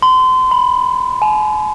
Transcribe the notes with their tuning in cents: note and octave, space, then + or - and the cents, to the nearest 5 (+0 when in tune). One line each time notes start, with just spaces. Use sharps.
C6 -30
B5 +0
G#5 +45